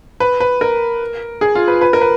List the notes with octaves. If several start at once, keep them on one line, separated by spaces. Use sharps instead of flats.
B4
B4
A#4
G#4
F4
B4
B4
A#4
B4